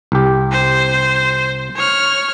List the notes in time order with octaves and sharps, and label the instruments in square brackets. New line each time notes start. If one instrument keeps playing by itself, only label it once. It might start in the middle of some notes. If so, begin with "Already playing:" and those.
[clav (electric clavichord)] C2 G4
[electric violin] C5
C#5 F6